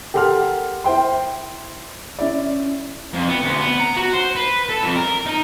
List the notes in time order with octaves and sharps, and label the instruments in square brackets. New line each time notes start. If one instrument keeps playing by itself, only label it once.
[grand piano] G4 A4 A#4 F#5 C6 F6
E4 C5 G5 C6
C#4 E4 D5
[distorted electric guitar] F2
B3
D2
B3
A#5
F#4
C5
B4
A4
F2
A#4
D#4